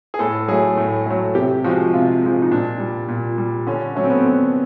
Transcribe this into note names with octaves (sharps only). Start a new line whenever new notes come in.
G#4
A2 A4
F#3 A3 G#4
A2
F#3 A3
C3 G4
F3 G#3 F#4
C3 F4
F3 G#3
D#4
A#2 D4
G3
A#2
G3
D3 C#4
F#3 A3 C#4
C4
B3
C4
D3